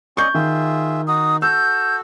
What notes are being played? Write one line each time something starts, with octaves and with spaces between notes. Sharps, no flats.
C#4 D5 D#5 C#6 G6
D#3 F4 G#4 E5
D#4 F#4 D#6
F#4 A4 E6 G6